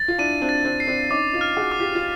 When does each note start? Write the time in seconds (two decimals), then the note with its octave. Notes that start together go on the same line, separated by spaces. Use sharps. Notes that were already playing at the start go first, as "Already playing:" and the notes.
Already playing: A6
0.08 F4
0.18 D4 E4 D#7
0.42 C4 D4
0.49 A6
0.65 C4 D4
0.80 C7
0.87 C4 D4
1.10 C#4 D#4 D6
1.33 D#4 F4
1.41 F6
1.57 F#4 G#4
1.72 D6
1.80 F4 G4
1.95 F4